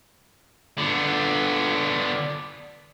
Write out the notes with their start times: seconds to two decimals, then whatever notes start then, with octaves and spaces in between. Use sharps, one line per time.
0.78 D3 B3